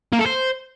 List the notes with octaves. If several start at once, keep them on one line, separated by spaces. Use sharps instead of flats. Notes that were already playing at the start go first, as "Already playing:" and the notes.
A#3
A4
C5